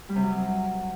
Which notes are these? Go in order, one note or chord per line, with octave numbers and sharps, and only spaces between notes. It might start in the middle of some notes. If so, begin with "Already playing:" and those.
G3
C3
F#3